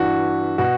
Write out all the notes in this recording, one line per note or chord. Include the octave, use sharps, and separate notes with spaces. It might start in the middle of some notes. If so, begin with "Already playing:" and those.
Already playing: G2 E3 F#4
B2 F#4